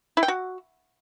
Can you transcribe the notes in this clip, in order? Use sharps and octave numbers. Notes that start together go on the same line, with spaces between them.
E4
G5
F#4